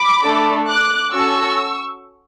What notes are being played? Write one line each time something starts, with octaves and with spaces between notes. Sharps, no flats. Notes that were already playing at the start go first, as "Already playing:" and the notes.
Already playing: B5 D6
A3 D4 A4
D6 F#6
C#4 F#4 A4 C#6 E6